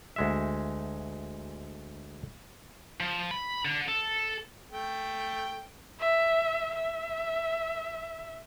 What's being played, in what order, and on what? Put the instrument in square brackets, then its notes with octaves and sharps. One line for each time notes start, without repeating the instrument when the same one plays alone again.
[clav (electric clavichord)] D2 G#3 E5
[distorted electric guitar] F3
B5
D3
A4
[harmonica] A3 G5
[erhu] E5
E5